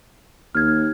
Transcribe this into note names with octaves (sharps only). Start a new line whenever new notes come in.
D#2 F6 G#6